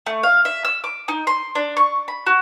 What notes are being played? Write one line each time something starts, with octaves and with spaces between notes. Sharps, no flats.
A3
F5
E5
E6
D6
D#4
C6
D4
C#6
B5
F#4